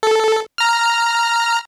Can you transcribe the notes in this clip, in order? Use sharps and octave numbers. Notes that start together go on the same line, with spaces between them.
A4
A#5 F6